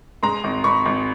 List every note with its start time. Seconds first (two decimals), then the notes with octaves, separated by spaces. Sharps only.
0.23 G#3 A#5 C6
0.44 G#1
0.64 G#1 B5 C#6
0.86 G#1